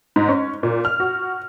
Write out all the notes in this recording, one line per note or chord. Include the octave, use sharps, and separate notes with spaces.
G#2
C#4
A#2
F6
F#4